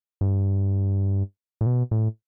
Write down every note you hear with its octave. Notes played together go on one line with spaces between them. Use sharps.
G2
A2
B2
A2